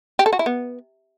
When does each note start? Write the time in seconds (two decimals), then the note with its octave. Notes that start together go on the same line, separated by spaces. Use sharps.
0.19 G4
0.26 A4
0.33 F#4
0.39 E4
0.46 B3